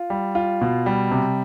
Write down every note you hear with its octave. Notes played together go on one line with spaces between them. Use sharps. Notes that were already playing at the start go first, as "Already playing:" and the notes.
Already playing: F4
G3
F4
B2
G3
C3